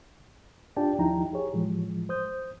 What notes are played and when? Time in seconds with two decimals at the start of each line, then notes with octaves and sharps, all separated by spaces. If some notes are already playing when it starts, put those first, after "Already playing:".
0.76 D4 F4 G4 D5 G5 A5
0.99 D#2 F3 D#4 E4 G5 A#5
1.33 G4 G#4 C#5
1.53 A2 E3 F3 G#3
2.09 C5 D#6 G6